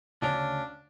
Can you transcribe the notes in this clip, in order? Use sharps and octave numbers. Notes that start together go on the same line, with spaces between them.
D2 C#3 C#4 D4